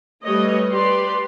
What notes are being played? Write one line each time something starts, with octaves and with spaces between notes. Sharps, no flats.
G3 A3 B4 C#5 D#5
G4 B4 D5 C6